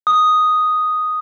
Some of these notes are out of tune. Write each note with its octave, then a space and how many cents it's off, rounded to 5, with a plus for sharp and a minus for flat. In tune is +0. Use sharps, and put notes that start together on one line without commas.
D#6 +0